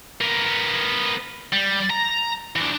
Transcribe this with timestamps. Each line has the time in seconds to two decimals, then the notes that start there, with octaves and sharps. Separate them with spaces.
0.21 B3 A#4
1.52 G3
1.90 A#5
2.56 E3 D4